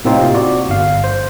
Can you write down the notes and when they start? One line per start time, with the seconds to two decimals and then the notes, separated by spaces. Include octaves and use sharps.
0.05 A2 C3 A#3 C4 D#4 F4
0.34 F#4 D5
0.69 G1 F5
1.04 C5